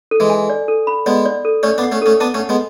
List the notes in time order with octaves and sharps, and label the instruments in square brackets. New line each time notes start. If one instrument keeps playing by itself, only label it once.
[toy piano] A4
[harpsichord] E3 G#3
[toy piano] G#5
D5
A4
B5
[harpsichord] G#3 B3 [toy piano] D5
[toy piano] D5
A4
[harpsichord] A3 C#4 [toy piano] D5
[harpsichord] B3 D4
[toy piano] F#5
[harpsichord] A3 C#4
[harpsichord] A3 C#4 [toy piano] A4
[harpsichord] B3 D4 [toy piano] A5
[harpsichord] A3 C#4
[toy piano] F#5
[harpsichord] G#3 B3